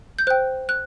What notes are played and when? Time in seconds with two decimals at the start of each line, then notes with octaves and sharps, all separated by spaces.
0.19 G6
0.27 C5 G5 F#6
0.69 F#6